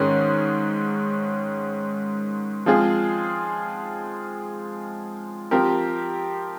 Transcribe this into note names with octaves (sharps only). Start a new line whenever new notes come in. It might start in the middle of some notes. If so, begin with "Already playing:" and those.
Already playing: G#2 D#3 G#3 C#4
F3 G#3 C4 F4 G#4
F3 C4 G4 A#4